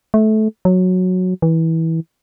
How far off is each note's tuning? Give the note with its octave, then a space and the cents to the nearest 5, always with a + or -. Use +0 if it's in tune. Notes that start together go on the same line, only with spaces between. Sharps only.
A3 -20
F#3 -10
E3 -20